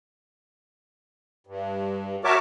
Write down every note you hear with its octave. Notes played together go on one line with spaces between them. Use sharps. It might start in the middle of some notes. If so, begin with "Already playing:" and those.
G2
F#4 A#4 C#5 E5 A5 D6